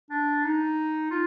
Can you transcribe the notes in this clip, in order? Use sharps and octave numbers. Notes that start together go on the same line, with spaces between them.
D4
D#4
F4